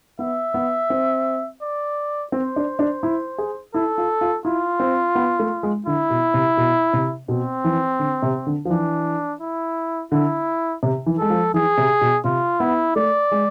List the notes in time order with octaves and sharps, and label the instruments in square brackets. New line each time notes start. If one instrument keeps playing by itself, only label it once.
[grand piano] B3 [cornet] E5
[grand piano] B3
C4
[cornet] D5
[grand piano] C4 [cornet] C5
[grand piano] D4
D4
E4
G#4
[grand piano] E4 [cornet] A4
[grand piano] F4
F4
[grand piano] E4 [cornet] F4
[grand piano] C4
B3
A3
G#3
[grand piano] D3 [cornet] E4
[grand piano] B2
C3
B2
C3
[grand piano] B2 [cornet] C4
[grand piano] E3
D3
C3
D3
F3
[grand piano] E3 [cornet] D4
[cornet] E4
[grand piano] D3 [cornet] E4
[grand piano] C3
E3
[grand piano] G#3 [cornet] A4
[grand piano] F3
[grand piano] E3 [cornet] G#4
[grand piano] C3
B2
[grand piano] C3 [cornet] F4
[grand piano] B3 [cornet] E4
[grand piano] A3 [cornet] D5
[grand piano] G#3